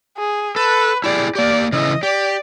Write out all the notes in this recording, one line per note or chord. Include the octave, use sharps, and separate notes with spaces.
G#4
A4 B4
E4 G4 G#4 D5
A#3 G4 D5
C#3 E3 E4 D#5
G4 D5